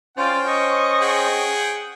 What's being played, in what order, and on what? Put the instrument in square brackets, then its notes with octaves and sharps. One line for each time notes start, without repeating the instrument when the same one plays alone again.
[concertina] C#4 C5 [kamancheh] F4 D5 [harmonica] G5
[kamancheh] D#5 C#6
[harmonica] G#4 F#5 G5